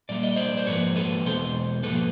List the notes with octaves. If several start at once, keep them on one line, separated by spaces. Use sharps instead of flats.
A#2 G3 A#3 D5
D#5
C5 D5
C5
G#2 F3 A#3 B4 C#5
A4 B4
E2 B2 G#3 C5
G#2 F3 A#3 A4 B4